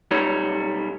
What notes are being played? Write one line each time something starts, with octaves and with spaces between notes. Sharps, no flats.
B1 G3 D#4 C#5